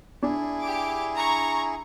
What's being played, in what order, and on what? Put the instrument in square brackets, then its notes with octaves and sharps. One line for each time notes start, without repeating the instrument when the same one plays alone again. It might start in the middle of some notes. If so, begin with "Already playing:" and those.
[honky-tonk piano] D4 [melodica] E4 G#4
[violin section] G4 D6
A#5 C#6